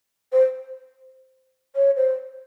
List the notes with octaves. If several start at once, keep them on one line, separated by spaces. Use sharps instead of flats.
C5
C#5
C5